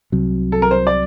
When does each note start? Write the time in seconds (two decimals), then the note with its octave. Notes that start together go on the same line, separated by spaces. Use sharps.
0.12 C2 C3 F#3
0.52 A4
0.62 A#4
0.71 C5
0.87 D5